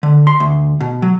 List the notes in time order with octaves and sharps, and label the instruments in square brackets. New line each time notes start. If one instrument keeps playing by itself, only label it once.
[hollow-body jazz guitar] D3
C6
D2
B2
F#3